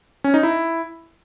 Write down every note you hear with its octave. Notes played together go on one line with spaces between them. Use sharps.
C#4
D#4
E4